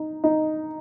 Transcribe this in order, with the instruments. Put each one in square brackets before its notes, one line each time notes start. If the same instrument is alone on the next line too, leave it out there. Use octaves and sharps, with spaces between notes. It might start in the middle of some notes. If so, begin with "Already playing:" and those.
Already playing: [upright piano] D#4
D#4